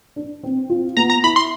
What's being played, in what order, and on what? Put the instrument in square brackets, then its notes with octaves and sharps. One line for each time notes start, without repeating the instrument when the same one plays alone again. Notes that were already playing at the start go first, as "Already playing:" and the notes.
[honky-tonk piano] D4
C4
F4
[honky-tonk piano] B3 [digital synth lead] A#5
[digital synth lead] A#5
[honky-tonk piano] E4 [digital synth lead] B5
[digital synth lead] C6